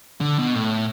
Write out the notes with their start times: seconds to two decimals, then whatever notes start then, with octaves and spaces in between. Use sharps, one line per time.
0.21 D3
0.39 B2
0.55 A2